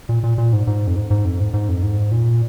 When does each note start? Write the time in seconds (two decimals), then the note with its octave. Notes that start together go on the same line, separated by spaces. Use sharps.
0.09 A#2
0.23 A#2
0.38 A#2
0.53 G#2
0.67 G#2
0.87 F2
0.96 G#2
1.11 G#2
1.25 F2
1.40 G#2
1.54 G#2
1.69 F2
1.83 G#2
2.11 A#2